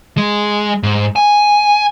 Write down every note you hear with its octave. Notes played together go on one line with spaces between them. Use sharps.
G#3
G#2
G#5